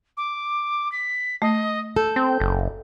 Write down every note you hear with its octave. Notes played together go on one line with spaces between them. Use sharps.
D6
B6
A3 D#5
A4 G6
C4
F#1